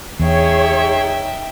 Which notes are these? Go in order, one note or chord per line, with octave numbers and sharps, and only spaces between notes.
E2 D#4 G#4 C#5 E5 G5